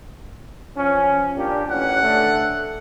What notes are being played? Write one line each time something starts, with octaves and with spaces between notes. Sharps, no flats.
F3 C#4
A#2 D4 G4
A1 C#4 F#5
D3 A3